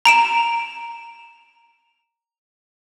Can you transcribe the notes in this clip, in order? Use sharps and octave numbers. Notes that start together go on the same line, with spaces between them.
A#5 D7 E7